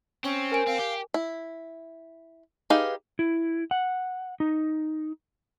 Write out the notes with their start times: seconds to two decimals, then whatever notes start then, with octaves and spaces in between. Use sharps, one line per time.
0.24 C4 C#4
0.52 A#4 G#5 D7
0.67 C4 F5
0.79 G4
1.14 E4
2.70 D#4 G4 G#4 B4 F5
3.19 E4
3.71 F#5
4.40 D#4